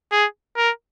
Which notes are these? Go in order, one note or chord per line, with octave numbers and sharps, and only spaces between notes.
G#4
A#4